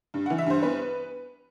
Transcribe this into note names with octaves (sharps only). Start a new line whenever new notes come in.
G2
F#5
E3
E5
G2 C5
B3 B4